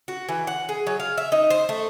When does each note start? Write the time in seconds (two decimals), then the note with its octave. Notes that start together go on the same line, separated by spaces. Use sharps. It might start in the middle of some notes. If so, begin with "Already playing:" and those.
0.08 F#4
0.29 E3
0.47 F#5
0.69 G#4
0.87 F#3
1.00 F5
1.18 E5
1.32 D#4
1.50 C5
1.69 A3